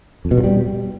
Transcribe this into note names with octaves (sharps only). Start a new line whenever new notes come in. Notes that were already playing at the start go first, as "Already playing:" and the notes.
F2
B2
G2
G3